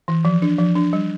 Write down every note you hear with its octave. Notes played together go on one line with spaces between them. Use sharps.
E3
F3
D4
F3
D4
G3